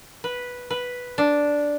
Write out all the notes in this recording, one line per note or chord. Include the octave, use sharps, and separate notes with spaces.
B4
B4
D4